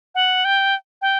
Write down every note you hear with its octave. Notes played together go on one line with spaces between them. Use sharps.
F#5
G5
G5